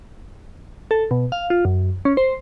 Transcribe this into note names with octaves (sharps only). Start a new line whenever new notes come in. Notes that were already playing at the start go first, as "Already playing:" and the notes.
A4
B2
F5
F4
F#2
C#4
C5